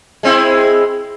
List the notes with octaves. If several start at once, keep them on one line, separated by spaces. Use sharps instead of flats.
G#3 C4 E4